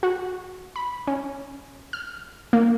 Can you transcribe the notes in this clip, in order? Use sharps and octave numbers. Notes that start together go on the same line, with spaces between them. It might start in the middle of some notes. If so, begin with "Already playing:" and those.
F#4
B5
C#4
F6
A#3